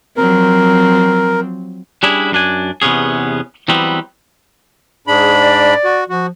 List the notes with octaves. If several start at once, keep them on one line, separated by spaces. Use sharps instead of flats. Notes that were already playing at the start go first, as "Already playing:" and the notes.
F3 F#3 C4 A#4
G3 C#4 D4 E4 G#4
F#2 D4 G#5
E2 C3 B3 C#4 G#4
E3 F#3 G3 B3 C4
G#2 D4 G#4 B5
D5
F#4
F3 F#4